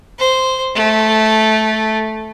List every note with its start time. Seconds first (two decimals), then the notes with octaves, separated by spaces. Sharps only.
0.19 C5
0.75 A3